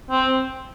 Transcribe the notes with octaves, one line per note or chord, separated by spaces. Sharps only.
C4